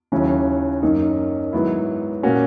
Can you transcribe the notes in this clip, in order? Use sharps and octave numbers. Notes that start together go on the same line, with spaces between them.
D#2 C#3 F#3 C#4 E4
F#2 D#3 A#3 D#4
G#2 D#3 F#3 B3 E4
A#2 A#3 C#4 F#4